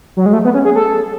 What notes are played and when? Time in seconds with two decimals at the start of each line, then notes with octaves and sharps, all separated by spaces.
0.17 F#3
0.26 G#3
0.33 A3
0.45 B3
0.54 C#4
0.65 G#4
0.75 A4